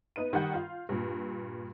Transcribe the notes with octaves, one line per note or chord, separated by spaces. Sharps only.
B3 D#4 B4 D#7
D#3 G3 F#5 G6
F4 F5
G2 A#2